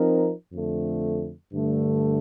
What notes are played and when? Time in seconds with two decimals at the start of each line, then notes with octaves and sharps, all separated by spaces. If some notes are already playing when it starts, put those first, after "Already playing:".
Already playing: F3 C4 D#4 A#4
0.51 F2 D3 A3
1.52 G2 D3 A3